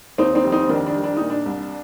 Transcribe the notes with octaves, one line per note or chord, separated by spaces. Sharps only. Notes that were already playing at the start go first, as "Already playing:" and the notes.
D#2 C4 D#4
C4 D#4
F1
C4 D#4
D#3 D4
D4
G3
D4
A#2 D#4
D4
C2